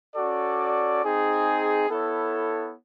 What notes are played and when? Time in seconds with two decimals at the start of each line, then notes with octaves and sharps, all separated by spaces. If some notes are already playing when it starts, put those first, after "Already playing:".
0.16 C#4 F#4 A4 D5
1.02 C4 D#4 G#4
1.88 B3 E4 A4 C#5